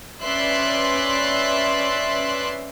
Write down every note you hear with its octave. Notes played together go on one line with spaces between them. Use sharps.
C#4 B4 D5 E5 C6 F#6